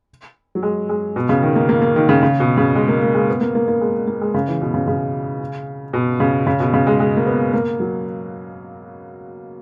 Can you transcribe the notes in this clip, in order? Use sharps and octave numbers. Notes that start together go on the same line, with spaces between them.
F#3
G#3
G#3
B2
C#3
D#3
A#3
A#3
A#3
D#3
C#3
C#3
B2
C#3
G#3
A#3
A#3
G#3
B3
A#3
A#3
A#3
G#3
A#3
G#3
C#3
E3
B2
C#3
C#3
B2
C#3
C#3
B2
C#3
G#3
G#3
A#3
B3
A#3
F#3